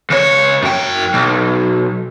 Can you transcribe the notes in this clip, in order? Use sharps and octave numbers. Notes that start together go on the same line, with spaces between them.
C#2 C#5
F#2 G5
B1